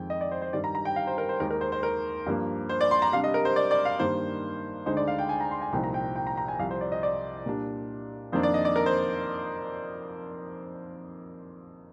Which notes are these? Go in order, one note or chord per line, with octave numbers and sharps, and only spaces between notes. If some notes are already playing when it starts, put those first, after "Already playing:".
Already playing: F2 D#3 G#3 G5
D#5
D5
C5
C5
G2 D#3 G3 D5
A#5
A#5
G5
F5
C5
A#4
C5
D#2 D#3 G#3 A#4
A#4
C5
C5
A#4
G2 F3 A#3
C5
D5
C6
A#5
C3 G3 D4 F5
D#5
A#4
C5
D5
D5
F5
G2 D#3 A#3 C5
D2 D3 G#3 D#4 C5
D5
F5
G5
G#5
A#5
C6
G#5
C2 A#2 F3 C4 D#4 G5
A#5
G5
G5
A#5
A#5
G#5
C2 C3 F3 F5
C5
D5
D#5
D5
A#2 G3 D4
F2 D#3 A#3 D4 C5
D5
D#5
D5
A#4
C5